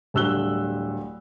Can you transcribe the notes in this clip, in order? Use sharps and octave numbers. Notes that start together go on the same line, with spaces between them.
D1 G2 E6 F#6 G7